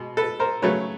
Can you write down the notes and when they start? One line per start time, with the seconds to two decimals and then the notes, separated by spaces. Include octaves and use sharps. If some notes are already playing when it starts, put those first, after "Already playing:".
Already playing: B2 G#3
0.17 A4 B4
0.40 A#4 C5
0.62 C#3 F#3 A3 B4 C#5